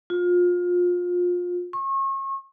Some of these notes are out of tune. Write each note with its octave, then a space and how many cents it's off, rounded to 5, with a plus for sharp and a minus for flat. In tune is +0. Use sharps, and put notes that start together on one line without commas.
F4 +25
C#6 -35